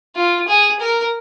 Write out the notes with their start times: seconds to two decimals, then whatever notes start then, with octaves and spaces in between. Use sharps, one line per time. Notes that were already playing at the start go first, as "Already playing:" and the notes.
0.16 F4
0.48 G#4
0.80 A#4